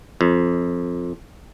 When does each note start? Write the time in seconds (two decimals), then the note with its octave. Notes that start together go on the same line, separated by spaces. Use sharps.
0.21 F2